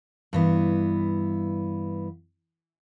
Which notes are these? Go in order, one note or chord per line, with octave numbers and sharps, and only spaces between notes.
G2 E3 B3